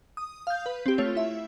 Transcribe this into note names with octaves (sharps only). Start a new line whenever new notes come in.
D#6
F5 G6
B4
C4 G4
A3 F4 C#5
E4 E5